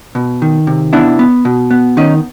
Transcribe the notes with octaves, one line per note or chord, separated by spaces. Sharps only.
B2
D#3
C3
B3 D4 E4
B3
B2
B3
D#3 C#4 D#4